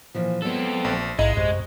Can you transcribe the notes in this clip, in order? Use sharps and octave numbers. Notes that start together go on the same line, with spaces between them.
A#2 E3 F3
F#3 G#3 B3 C4 A4
A#1
A#1 G#2 G#3 E4 D#5
F#2 C3